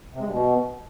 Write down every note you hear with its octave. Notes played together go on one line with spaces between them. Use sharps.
C3
G#3
G2
B2